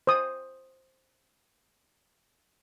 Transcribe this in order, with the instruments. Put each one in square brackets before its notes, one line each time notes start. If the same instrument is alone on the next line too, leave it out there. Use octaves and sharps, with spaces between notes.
[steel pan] C5 D#6